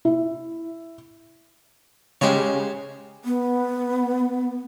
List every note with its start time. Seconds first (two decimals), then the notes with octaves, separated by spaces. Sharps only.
0.05 E4
2.21 C#3 G#3 C#4 G4 C5 C#5
3.25 B3